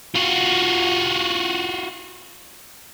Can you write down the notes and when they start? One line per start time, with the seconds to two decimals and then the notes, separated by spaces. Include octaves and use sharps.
0.15 F4 F#4